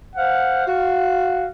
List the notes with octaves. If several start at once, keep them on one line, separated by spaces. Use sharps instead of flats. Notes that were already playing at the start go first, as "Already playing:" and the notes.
C5 F5 F#5
F#4 F5